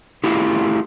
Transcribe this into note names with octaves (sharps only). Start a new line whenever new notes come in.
A3 E4 F4 G4